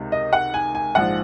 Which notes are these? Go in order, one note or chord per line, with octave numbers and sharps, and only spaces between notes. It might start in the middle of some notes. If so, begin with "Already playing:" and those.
Already playing: C#2 C3 D#3
D#5
F#5
G#5
G#5
A#1 G#2 F3 F#5